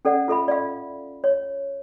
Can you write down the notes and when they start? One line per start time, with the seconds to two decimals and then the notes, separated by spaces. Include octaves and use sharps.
0.05 C#4 A4 D5 F#5
0.28 F4 A4 E5 B5
0.48 D5 E5 F5
1.24 C#5